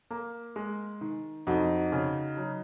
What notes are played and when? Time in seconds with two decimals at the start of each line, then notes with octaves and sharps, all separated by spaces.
0.10 A#3
0.56 G#3
1.01 D#3
1.47 F2 D#4 F#4
1.92 C#3
2.37 F#3